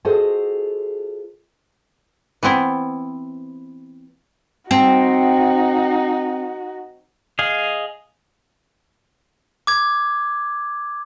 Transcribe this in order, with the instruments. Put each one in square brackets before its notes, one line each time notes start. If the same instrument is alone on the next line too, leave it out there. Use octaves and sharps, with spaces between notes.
[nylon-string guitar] F4 F#4 G#4 A4 C5 D#5
[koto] E3 B3 C4 E4
[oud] C4 [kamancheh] D#4 F#4
[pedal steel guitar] G#4 D#5 F5
[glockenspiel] D6 G#6